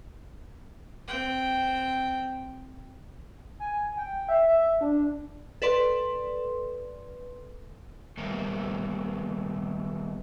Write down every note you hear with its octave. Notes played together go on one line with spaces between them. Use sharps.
C4 G5
G#5
G5
E5
E5
D4
A4 B4 D5 C6
D#3 G3 A3 B3 A#4 C5